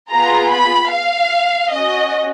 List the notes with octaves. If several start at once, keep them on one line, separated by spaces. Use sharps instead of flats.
B3 F4 G#4 A#5
B5
F5
C#4 F#4 D#5